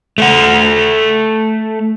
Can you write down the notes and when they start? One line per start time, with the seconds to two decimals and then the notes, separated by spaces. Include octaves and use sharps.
0.18 A3 A4 F#5